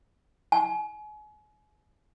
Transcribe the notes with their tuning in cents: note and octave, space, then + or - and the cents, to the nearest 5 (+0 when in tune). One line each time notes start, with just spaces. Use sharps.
G#5 +35